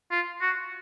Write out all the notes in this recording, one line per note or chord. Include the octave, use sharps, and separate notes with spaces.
F4
F#4